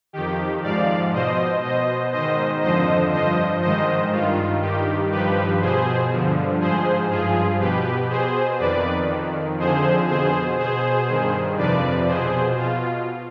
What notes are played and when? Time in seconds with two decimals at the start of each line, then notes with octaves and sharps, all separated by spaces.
0.13 F2 D#3 G4
0.63 G#2 F3 D5 F5
1.13 B2 C5 D#5
1.63 B2 C5 D#5
2.12 G#2 D#3 C5 D#5
2.62 F2 D3 F3 C5 D#5
3.12 G2 F3 C5 D#5
3.62 G#2 D#3 C5 D#5
4.12 G2 D#3 F4
4.61 G2 D#3 G4
5.11 G2 F3 G4 B4
5.61 B2 G#4 C5
6.11 G2 D3 F3
6.60 G#2 F3 G#4 C5
7.10 G2 F3 F4 G#4
7.60 B2 G4 B4
8.10 B2 G#4 C5
8.59 F2 D#3 B4 D5
9.09 F2 D#3
9.58 F2 D3 F3 G#4 C5
10.08 B2 G#4 C5
10.59 B2 G#4 C5
11.09 G2 D#3
11.58 F2 C3 F3 B4 D5
12.07 B2 G#4 C5
12.57 B2 F4